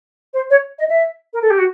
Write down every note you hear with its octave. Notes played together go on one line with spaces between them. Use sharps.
C5
C#5
D#5
E5
A#4
A4
G4
F#4